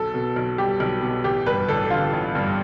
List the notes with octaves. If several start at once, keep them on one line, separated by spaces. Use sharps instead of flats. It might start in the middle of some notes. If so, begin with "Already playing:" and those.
Already playing: B1 A4
B2
B1
G3 G4
B1
B2
A1 G4
G2 B4
A1 A4
D3 F4
A1
G2